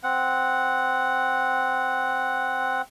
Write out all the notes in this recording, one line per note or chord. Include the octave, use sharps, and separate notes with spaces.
C4 F#5